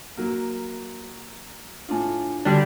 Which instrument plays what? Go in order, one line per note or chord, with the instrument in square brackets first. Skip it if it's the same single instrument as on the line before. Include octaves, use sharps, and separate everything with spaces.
[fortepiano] F#3 A#3
[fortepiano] A2 F4 [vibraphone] D4 G#5
[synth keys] D3 G3 D4 [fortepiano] F#3